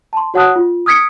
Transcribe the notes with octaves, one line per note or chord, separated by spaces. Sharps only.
A5 C6
F#4 C#5 F#5 A5 D#6 F#6
F4
D#6 F6 G#6 B6 C#7 D7